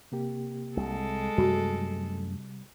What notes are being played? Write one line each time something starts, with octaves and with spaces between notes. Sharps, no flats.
C3 A#3 G4
C2 G#3 A4
F#2 C3 G3 A3 F#4